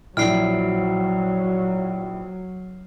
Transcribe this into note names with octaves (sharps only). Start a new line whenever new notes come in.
A#1 F#3 E4 F6 C7 D7